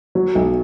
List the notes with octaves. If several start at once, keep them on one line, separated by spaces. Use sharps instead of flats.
F#3
B1